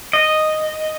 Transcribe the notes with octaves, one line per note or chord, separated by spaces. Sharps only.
D#5